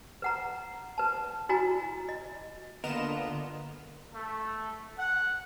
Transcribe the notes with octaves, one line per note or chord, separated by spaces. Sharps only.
B4 F#5 A#5
B4 A5
E4 F#4 G#5 A#5
D#5
D3 A#3 B3 F4 A#4 D#5 E7
A3
F#5